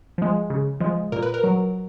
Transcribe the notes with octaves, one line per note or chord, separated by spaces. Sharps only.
F3 G#3
C#3
F3 G#3
A#2 A#4
B4
A#4
F#3